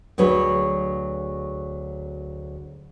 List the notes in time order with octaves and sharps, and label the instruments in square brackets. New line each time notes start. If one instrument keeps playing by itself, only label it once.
[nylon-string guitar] D2 F#3 G#4 B4 C#5